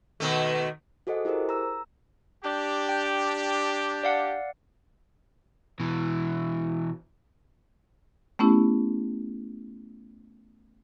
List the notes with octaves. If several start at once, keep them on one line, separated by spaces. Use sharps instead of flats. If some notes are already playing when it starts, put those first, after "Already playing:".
B2 D#3 A3
F#4 G#4 A4 C5 D#5 F#5
E4 G4 G#4 A#4 C5
A#5 E6
D4 G4
G5 G6
D5 F5 F#5
B2 E3
A3 B3 C#4 E4 G4